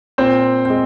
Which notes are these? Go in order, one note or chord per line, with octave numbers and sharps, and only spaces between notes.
A#2 C4 C5
G#3 C4